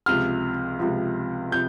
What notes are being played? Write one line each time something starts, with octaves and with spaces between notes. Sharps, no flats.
C#2 C3 F3 F6
C#2 C3 F3
C3 F3 G6